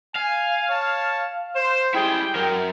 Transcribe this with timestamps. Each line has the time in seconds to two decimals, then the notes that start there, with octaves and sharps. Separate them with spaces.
0.15 F5 G#5
0.70 C#5 A5
1.55 C5 E7
1.95 G3 G#3 E4 G#4 G5 C6
2.35 F#3 A#4